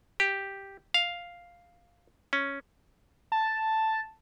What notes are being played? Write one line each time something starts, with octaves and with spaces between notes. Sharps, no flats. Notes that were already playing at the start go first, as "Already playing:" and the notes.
G4
F5
C#4
A5